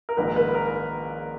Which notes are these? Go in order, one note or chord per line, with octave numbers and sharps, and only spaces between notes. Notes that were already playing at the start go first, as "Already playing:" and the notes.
A#4
A#1 G#2 D#3 B4
A#4
B4
B4
A#4